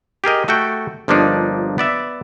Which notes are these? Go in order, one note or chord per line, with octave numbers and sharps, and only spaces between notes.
G4 G#4 A#4 D#5
A3 F#4 A4 G5
G1 F3 A#3 D4 D#4
B3 D5 E5